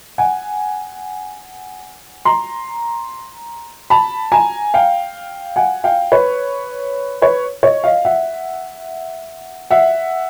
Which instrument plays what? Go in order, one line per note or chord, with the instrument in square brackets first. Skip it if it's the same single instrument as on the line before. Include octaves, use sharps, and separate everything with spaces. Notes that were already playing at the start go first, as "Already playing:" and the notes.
[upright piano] F#5 G#5
A#5 C6
A5 B5
G#5 A#5
F5 G5
F#5 G#5
F5 G5
B4 C#5
B4 C#5
C#5 D#5
D#5 F5
E5 F#5
E5 F#5